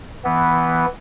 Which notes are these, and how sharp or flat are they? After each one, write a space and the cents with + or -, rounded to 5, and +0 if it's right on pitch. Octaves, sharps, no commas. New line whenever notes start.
E3 -5 B3 +0